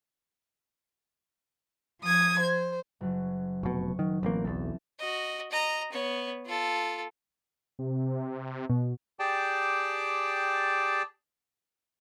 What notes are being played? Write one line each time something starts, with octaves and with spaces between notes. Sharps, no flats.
F3 D#6 G#6
C5
F#1 F#3
F1 B2 C#6
D#3 F#3
A1 E3 A#3 C4
B1 E2 A4
F#4 D#5
D#5 A#5
B3 C#5
F4 A4
C3
B2
G4 G#4 D5 G5 A5